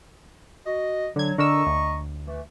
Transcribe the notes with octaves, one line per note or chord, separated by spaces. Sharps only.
F#4 D#5
D3 F#3 G#6
D3 A#4 D#5 A#5 C#6 E6
D2
E3 A3